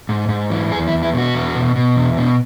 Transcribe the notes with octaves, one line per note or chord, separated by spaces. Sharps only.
G#2
G#2
E3
E2 G#4
E4
E2
E4
B2 F#4
E2
B2
B2
E2
B2